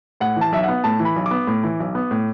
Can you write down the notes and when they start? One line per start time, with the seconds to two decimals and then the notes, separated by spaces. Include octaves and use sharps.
0.20 A2 F#5
0.36 E3
0.41 A5
0.52 B1 E5
0.63 B3 F#5
0.84 A2 A5
0.99 E3
1.05 B5
1.16 B1
1.26 D6
1.31 B3
1.47 A2
1.63 E3
1.80 B1
1.95 B3
2.11 A2